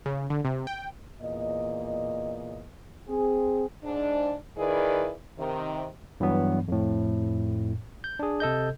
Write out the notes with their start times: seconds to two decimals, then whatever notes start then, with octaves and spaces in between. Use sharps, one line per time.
0.06 C#3
0.30 D3
0.45 C3
0.67 G5
1.21 E2 A#2 D#5
3.09 C4 G#4
3.84 G#2 D4
4.58 D#3 E4 G#4 B4 D5
5.39 C3 D#3
6.20 G2 E3 F#3 B3
6.68 F2 A2
8.04 G6
8.19 D4 G#4
8.40 C3 A4 D#5 G6